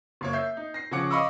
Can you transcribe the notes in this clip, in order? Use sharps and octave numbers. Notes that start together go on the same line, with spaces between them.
F#1 A#3 C#5
E5 G6 C7
D#4
A#6 C7
C#3 F3 C#5 F#5 D6 C#7
D#5 F5 B5 C#6 D6 E6